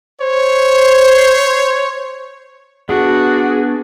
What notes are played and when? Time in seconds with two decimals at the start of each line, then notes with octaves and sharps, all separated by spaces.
0.21 C5 C#5
2.89 B3 D4 F#4 G#4